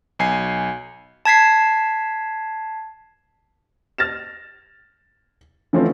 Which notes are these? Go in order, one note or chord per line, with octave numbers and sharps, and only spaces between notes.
B1 G#5 C7
A5 G#6 B6 C7
F6 A6 A#6 E7
D3 E3 F3 A3 C4 C#4